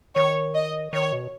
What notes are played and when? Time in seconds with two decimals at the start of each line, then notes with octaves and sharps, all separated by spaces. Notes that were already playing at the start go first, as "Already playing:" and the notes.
0.16 D#3 C#5
0.54 D#5
0.93 D#3 C#5
1.12 B2